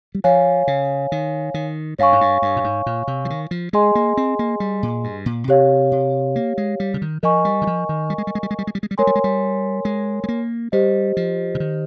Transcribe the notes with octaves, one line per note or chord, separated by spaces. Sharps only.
G3
F3 C#5 F5 G#5
C#3
D#3
D#3
G2 C#5 F5 G#5 C#6
G#2
G2
G2
A#2
G#2
A#2
C3
F3
D#3
F3
G#3 G#4 D#5 G#5 C6
A#3
C4
A#3
G3
A#2
G2
A#2
C3 G4 C#5 F5
C3
A#3
G#3
G3
C#3
D#3
F3 A#4 D#5 G#5 C#6
G3
D#3
F3
D#3
G3
G#3
G3
G#3
G3
G#3
G3
G#3
G3
G#3
G3
G#3 A#4 C#5 G#5 C6
G3
G#3
G3
G#3
G#3
A#3
G3 G4 C5 D#5
F3
C#3
D#3